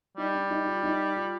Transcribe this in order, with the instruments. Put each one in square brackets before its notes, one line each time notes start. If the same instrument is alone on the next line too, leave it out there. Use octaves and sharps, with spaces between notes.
[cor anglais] G3 [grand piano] D#4
[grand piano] D4
D#4
F4
D#4
F4